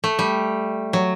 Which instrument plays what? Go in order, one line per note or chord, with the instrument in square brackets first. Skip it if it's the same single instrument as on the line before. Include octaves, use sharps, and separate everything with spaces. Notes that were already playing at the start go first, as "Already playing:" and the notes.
[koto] A3
G3
F#3